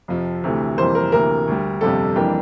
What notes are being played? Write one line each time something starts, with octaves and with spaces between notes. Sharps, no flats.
F2 C3 F3
D2 C3 E3 A3
F2 C3 E3 G3 A#3 C5
A#4
D2 C3 E3 A#3 A#4
D2 D3 G3
G1 F2 C3 G3 A4
F2 E3 G3 A#3 D4 G4